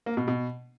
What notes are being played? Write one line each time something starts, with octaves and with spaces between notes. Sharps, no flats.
A#3
B2
B2